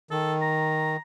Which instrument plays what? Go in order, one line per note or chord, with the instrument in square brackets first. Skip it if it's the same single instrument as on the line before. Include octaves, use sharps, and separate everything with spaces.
[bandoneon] D#3 [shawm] A4
[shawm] A#5